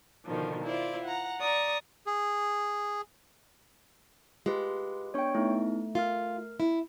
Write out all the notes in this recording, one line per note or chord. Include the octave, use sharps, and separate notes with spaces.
B2 D3 D#3 F3
E4 F4 C5 D5
F#5 A#5
D5 A#5 C#6 D#6
G#4
G#3 F4 G4 B4
B3 D4 C#5 G5 C#6
A3 B3 D#4 E4
F4 A#4 F6
E4